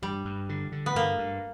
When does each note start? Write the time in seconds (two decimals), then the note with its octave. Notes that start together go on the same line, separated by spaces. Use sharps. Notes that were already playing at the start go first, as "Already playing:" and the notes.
0.02 G2 G3
0.25 G2
0.49 D3
0.72 D3
0.86 B3
0.95 G2 A#3
1.18 G2